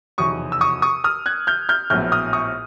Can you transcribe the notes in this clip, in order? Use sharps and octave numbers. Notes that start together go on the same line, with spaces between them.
F1 E2 B2 F#3 C#6 D#6
E6
C#6 D#6
C#6 D#6
D#6 F6
F#6 G#6
F6 G6
F6 G6
A#1 A2 F#3 B3 F6 G6
D#6 F6
C#6 D#6